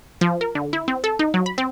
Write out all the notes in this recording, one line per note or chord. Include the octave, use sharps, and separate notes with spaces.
F3
A#4
D3
E4
C4
A4
D#4
F#3
B5
C4